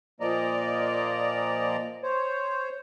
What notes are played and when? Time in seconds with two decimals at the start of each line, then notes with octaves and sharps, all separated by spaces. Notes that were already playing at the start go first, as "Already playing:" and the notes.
0.21 A#2 F3 A#3 D5 D#5 A#5
2.03 C5 C#5